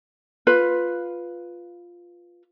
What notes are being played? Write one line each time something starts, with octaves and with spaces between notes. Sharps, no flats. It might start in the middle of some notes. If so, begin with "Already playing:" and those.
F4 B4